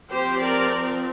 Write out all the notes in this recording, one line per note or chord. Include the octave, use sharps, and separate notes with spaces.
F3 C4 G4 C5
A#4 D5